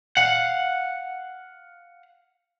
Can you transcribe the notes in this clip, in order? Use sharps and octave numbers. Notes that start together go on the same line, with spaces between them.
F5 F#5